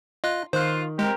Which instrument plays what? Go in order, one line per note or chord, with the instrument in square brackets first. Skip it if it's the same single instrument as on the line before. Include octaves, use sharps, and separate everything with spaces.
[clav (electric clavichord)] F4 [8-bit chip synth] D#5 F#6
[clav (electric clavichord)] D#3 [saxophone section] F4 [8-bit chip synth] C5 F#6
[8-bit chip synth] G#3 [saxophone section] C4 G4 A#4